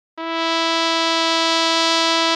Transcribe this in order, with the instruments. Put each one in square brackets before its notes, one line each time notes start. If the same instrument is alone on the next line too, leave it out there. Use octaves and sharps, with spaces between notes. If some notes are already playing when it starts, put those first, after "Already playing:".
[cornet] E4